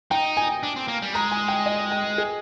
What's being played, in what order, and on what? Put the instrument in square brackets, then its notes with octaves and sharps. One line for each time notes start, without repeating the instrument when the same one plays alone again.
[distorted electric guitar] D#4 [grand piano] G5
[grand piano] G#5
[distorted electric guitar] D4
C4
A#3
G3
[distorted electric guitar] G#3 [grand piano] A#5
[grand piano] G#5
G5
D#5
G5
G#4